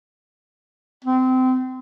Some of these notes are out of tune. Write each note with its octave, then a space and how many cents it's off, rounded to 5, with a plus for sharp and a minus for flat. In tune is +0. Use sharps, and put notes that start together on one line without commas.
C4 -25